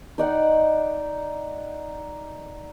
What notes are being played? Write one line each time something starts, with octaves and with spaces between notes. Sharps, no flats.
D#4 D5 F#5 G5